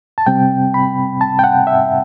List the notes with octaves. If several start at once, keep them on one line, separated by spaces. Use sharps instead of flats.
A5
C3 G3 C4 G5
B5
A5
G5
F#5
E5